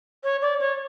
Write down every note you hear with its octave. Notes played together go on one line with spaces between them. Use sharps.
C#5
D5
C#5